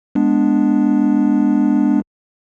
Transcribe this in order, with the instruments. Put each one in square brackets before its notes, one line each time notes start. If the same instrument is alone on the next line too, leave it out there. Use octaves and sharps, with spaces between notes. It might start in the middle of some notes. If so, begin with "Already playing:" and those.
[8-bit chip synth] G#3 B3 D4